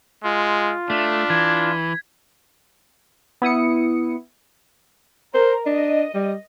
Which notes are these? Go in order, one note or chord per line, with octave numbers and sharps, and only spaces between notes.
G#3 F4
A3 D4 B6
E3 G#6
B3 E4 D#6 C#7
A#4 C5
D4 D#5
G3